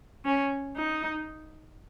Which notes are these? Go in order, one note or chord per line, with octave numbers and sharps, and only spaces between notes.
C#4
D#4